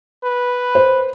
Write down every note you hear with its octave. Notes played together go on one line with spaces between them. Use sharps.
B4
C5